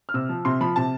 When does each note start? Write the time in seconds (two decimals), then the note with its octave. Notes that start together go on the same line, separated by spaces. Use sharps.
0.09 F6
0.14 C3 E6
0.29 F3
0.45 C3 C6
0.61 F3 B5
0.76 C3 A5